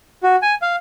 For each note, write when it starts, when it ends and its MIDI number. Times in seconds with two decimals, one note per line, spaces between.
0.23 0.36 66
0.42 0.55 80
0.62 0.76 77